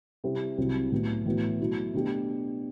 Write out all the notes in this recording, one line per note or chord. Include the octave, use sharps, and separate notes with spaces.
C3 G3 C4 E4
C2 C3 F#3 C4
A2 F#3 B3
A2 E3 B3 F#4
B2 F#3 A3 E4
B2 A3 D4 G4